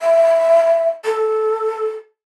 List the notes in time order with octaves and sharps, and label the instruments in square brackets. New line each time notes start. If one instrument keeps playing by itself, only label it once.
[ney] E5
A4